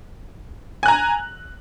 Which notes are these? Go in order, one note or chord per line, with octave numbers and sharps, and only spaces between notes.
G#5 A#5 F#6